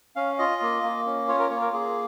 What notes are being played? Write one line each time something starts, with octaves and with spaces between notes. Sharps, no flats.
C#4 F5
F4 D#5
A#3
A#3
C#4
F4 C#5
A#4
A#3 C#5
A#4
A#3 G#4